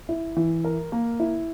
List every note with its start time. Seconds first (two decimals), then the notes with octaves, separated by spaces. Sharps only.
0.09 E4
0.37 E3
0.64 A#4
0.92 A#3
1.20 E4